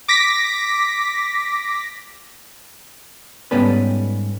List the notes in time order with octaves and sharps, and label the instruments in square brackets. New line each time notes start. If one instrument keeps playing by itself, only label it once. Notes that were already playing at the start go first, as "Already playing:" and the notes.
[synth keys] D6 A#6 B6
[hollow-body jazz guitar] G#2 G3 B3 C#4 A4 B4